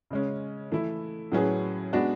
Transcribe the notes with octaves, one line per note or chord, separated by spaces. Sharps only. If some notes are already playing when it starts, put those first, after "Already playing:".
C#3 G#3 C#4
E3 A3 E4
A2 F#3 C#4 G#4 B4
G#3 B3 D4 F#4